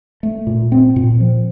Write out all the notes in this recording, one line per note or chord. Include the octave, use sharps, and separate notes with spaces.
A3
A#2
C4
A#2
F3